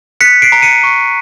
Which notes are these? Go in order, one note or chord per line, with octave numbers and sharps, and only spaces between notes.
F#6 B6 C#7
C7 D7
A#5
C#7 D#7
C#6